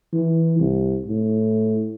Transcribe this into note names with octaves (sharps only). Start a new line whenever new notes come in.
E3
C2
A2